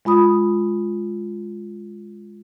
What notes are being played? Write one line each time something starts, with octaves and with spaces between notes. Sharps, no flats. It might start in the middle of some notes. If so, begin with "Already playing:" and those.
G#3 F4 B5 D#6